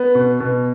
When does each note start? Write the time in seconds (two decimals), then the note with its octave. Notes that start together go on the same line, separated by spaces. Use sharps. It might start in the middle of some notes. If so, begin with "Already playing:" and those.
Already playing: B3
0.15 B2
0.40 B2